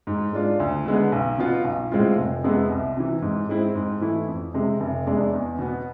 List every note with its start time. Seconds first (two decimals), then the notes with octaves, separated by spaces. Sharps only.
0.07 G#2
0.33 G#3 D4 F4
0.60 D2
0.86 D3 G#3 B3
1.12 B1
1.38 B2 B3 F4
1.65 B1
1.91 A2 G#3 C4 F4
2.17 F1
2.44 F2 C3 G#3 B3
2.70 C2
2.97 C3 E3
3.22 G#2
3.49 G#3 C4 E4
3.75 G#2
4.01 E3 A3 E4
4.28 F2
4.54 C3 G#3
4.80 F1
5.07 E2 C3 G#3 D4
5.33 E2
5.59 B2 B3